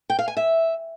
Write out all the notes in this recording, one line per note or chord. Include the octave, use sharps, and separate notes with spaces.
G5
F5
G#5
E5